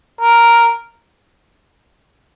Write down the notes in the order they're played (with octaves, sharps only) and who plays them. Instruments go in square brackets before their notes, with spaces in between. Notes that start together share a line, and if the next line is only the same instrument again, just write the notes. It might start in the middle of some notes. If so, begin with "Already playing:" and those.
[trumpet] A#4